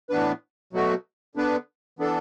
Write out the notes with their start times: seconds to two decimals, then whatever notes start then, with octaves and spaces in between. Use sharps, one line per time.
0.10 A2 E3 B3 D4 B4
0.73 B2 F#3 A3 F#4
1.35 D3 B3 D4 B4
1.99 E3 B3 D4 A4